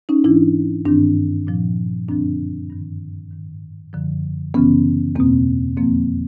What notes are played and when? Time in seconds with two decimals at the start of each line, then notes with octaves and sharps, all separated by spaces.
0.09 C#4 D#4
0.24 G#2 E3 D4 E4
0.85 G2 D#3 C4 D4
1.47 A#2 F3
2.08 F#2 D3 F3 C4 D4
2.70 G2 D#3
3.31 G#2 D#3
3.93 F#2 D3 F3
4.54 F#2 C#3 E3 B3 C#4
5.15 E2 B2 A#3 C4
5.77 F2 D3 F3 A#3 C4